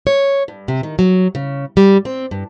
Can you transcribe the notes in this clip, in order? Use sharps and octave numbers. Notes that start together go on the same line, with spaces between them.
C#5
G2
C3
D#3
F#3
C#3
G3
C4
G2